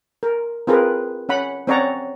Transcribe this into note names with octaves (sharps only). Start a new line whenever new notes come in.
A#4
C4 F4 G#4 A#4 B4
C#4 F#5 B5
C4 C#4 C#5 D5 F#5 A#5